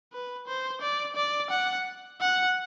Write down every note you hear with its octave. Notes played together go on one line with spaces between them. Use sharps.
B4
C5
D5
D5
F#5
F#5